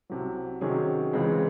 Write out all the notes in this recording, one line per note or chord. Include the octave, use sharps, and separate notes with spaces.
C2 C3 F#3
C3 D#3 F#3 C#4 G#4
C#2 C#3 E3 G#3 C4